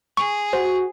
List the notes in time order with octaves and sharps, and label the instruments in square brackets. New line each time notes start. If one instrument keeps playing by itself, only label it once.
[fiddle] G#4 [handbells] C#6
[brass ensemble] F#4 [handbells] C5